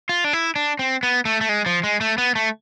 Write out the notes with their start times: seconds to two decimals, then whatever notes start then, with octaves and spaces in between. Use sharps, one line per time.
0.09 F4
0.24 D4
0.33 E4
0.56 D4
0.79 C4
1.03 B3
1.25 A3
1.41 A3
1.49 G#3
1.66 F3
1.84 G#3
2.01 A3
2.18 B3
2.36 A3